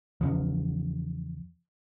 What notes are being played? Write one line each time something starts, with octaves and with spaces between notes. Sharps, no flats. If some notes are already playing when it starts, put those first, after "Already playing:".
E2 C#3 F3